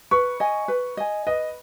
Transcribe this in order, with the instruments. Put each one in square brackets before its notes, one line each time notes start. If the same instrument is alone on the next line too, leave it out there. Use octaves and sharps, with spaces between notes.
[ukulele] B4 [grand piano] C#6
[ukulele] D#5 G#5
B4
D#5 G#5
[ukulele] B4 [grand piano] D#5